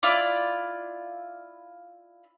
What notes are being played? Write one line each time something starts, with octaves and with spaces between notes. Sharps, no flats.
E4 F4 D5 D6